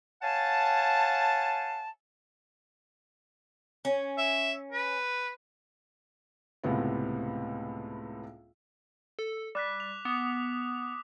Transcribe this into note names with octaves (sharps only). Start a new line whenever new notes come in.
C#5 F5 F#5 G#5 A5
C#4
E5
B4
C#2 A2 C3 B3
A4
G3 D6 F#6 B6
F7
B3 D6 D#6